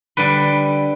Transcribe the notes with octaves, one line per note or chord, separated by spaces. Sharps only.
D3 G3 B4